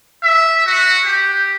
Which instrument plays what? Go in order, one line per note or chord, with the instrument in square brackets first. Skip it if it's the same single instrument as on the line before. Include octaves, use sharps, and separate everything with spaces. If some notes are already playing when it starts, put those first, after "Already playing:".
[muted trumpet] E5
F#4
G4